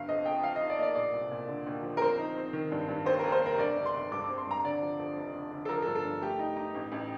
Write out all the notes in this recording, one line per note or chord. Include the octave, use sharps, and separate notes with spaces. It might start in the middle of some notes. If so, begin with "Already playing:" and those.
Already playing: G1 F5
F2 D#5
F2 G5
F3 F5
D#5
D#4
D5
A#3 D5 D#5
A#2 D5
C2
A#2
D3
D#2
F3
A#4
C4 C5
D#4
C4
D#3
G2
G2
D#2 C5
D#2 A#4
C5
F1 A#4
G1 D5
G1
C6
G1
G2 D6
C4 D6
C6
G2 A#5
D3 D5
F3
F2
F1
D3
D3
A4
F3 A#4
A4
G2
A4
G2
A3 G4
D#4
D#4
A1
A1